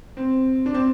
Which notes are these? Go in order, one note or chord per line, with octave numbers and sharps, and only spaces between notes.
C4
D4
C4